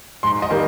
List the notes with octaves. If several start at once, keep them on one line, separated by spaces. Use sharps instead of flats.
G#2 C6
D#5
D#3 G3 A#3